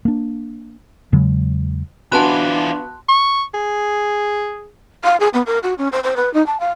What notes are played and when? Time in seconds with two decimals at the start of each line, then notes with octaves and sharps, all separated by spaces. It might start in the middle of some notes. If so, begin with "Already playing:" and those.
0.05 A#3 D4
1.12 E2 C#3 F#3 G#3
2.12 E3 B3 D4 F4 F#4 A5 C6 F#6
3.08 C#6
3.54 G#4
5.04 F5
5.20 G#4
5.34 B3
5.46 A#4
5.63 F#4
5.78 C#4
5.92 C5
6.04 C5
6.16 B4
6.34 D#4
6.46 A5
6.60 F5